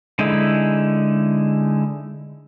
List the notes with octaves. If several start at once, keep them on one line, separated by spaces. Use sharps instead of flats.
D3 G#3 D#4 E4